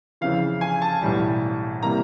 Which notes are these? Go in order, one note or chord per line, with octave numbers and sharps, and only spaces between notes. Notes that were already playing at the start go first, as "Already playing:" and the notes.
F2 C#3 E3 F5
G#5
A5
B1 A2 E3 G3
C3 E3 G3 A#3 A#5